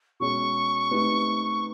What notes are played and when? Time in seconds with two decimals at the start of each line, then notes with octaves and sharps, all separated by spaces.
0.20 B2 G#3 C#4 F#4 C#6
0.91 A3 C4 D#4 G4 B4